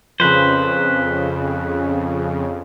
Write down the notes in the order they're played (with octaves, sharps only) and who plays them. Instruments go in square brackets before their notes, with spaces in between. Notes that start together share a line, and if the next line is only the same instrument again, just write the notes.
[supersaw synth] F2 C#3 [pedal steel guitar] B4 C5